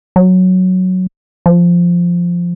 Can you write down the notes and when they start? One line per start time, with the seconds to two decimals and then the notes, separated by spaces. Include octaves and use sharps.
0.16 F#3
1.46 F3